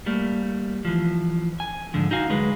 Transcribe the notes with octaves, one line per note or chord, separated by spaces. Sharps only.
G3 A3 A#3
E3 F3
G#5
G#2 D3 F3
D#4 F#4 F5 G#5
D2 F#3 G#3 B4